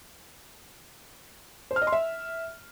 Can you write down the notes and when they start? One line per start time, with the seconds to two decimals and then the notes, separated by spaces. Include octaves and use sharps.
1.71 C5
1.76 F6
1.82 D#5
1.87 C6
1.92 E5